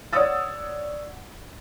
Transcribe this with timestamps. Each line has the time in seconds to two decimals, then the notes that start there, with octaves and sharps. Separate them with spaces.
0.13 C#5 D5 F#5 D#6 E6 A6